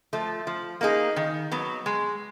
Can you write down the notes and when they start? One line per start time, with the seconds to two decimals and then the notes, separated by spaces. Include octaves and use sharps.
0.13 F3 A3
0.47 F3
0.81 A#3 D#4 G#4
1.16 D#3
1.52 F#3 B3
1.86 G#3